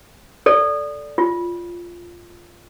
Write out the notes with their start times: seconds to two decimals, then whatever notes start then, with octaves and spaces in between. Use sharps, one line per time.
0.46 A4 D5
1.18 F4